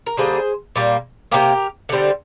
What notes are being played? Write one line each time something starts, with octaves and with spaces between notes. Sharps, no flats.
A#4
D3 G3 A#3 G#4 C5
A#2 G3 A#3
C3 D#3 A#3 G4 A#4
D3 G3 C4